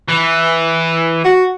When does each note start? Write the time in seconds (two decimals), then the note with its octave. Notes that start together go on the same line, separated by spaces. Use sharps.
0.09 E3
1.25 F#4